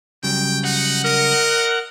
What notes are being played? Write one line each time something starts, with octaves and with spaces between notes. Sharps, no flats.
C#3 F#3 G3 G5
D#4 F#5
A#4 D#5